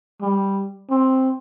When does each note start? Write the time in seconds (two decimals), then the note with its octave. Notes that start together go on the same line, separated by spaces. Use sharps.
0.21 G3
0.90 C4